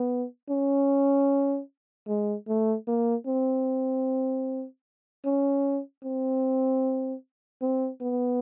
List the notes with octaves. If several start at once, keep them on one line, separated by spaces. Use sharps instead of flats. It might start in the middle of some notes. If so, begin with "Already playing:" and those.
Already playing: B3
C#4
G#3
A3
A#3
C4
C#4
C4
C4
B3